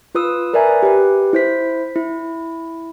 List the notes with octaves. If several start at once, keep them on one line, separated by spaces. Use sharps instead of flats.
F4 B4 D#6 E6
A#4 B4 D5 E5 G#5 A#5
G4 B4
E4 C5 B6
E4